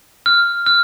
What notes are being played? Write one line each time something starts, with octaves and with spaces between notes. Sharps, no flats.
F6
F6